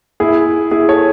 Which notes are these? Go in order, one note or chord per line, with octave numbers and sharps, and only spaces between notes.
E4 G#4
E4 G#4
A4 C#5